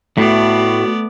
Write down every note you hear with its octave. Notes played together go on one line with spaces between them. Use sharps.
A2 A3 B3 F#4 D5